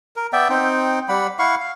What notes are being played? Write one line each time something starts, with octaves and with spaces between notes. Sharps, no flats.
A#4
B3 D5 E5 G5
C4 D#4 G5
G3 F#5 B5
E4 F5 F#5 C#6
F5